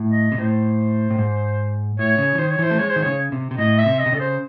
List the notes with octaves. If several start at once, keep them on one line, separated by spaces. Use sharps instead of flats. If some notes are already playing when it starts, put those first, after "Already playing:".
Already playing: A2
D#5
C3
A2 C5
A2
G#2
A2 C#5
C#3
E3
D#3 C5
C#5
E3 C5
A3
G#3 C#5
C5
D#3
C#3 C#5
C3
C3
A2 D#5
E5
C3
D#5
C3
C#3 A4
C5